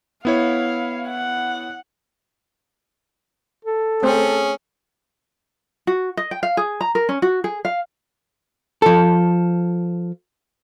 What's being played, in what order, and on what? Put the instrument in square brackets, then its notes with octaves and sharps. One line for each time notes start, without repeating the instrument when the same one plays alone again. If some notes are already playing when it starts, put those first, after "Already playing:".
[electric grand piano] B3 E4 C#5 [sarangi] F5
[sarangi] F#5
[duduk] A4
[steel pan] A3 C4 C5 [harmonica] C#4 G#4
[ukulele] F#4
D#5
G5
F5
G#4
A#5
A#4
C#4
F#4
G#4
F5
[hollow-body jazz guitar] F3 A4